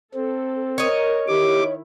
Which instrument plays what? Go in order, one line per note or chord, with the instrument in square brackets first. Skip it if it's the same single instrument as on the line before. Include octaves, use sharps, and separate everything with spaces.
[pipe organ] C4 [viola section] A4
[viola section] A#4 [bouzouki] C#5 D#5
[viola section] D#3 E4 [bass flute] G4 [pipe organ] D6